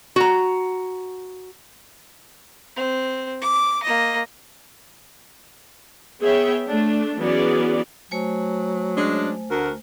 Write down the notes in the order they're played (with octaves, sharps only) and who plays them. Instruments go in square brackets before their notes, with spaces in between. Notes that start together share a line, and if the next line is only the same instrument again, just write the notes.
[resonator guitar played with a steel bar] F#4 A#5
[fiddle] C4
D6
A#3 D#5
[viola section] B3 G#4 C#5 E5 G5
A3 D4
E3 F#3 B3 C#4 G#4 D5
[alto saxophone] F#3 [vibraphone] A3 C5 G#5
[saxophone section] G#3 C#4 D4
D2 F#4 A#4